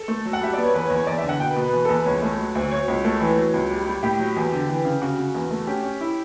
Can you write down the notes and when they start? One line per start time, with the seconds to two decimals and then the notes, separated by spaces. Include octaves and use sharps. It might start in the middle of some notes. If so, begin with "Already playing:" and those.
Already playing: A4
0.08 A3
0.25 F#3
0.33 F#5
0.41 G3 E5
0.53 B3 D5
0.64 C#5
0.74 E2 B4
0.86 C#5
0.90 E2
0.96 C#5
1.07 E2 D5
1.18 E5
1.23 D3
1.29 F#5
1.40 B2 G5
1.51 B4
1.56 B2
1.62 B4
1.73 E2
1.85 E2 A4
1.95 B4
2.05 C#2 C#5
2.22 A3
2.38 F#3
2.55 D2
2.71 F#3 C#5
2.88 C#2
3.04 A3
3.20 E3
3.37 F#3
3.54 C#2
3.70 G3
3.86 G3
4.03 A2 G4
4.19 F#3
4.36 E2
4.52 D3
4.69 E3
4.85 C#3
5.02 C#3 F#4
5.18 C#3
5.34 E2
5.51 A3
5.67 C#4 G4
5.83 C#4
6.01 E4